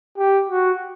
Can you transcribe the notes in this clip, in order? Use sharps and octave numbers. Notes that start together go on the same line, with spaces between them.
G4
F#4